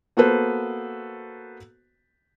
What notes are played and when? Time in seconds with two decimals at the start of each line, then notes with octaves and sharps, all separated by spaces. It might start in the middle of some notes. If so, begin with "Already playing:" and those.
0.17 A#3 B3 F#4 A4 B4 C5